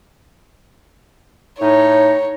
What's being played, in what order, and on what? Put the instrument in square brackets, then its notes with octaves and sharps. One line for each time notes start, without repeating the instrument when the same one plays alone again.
[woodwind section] A2 D#4 [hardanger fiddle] C#5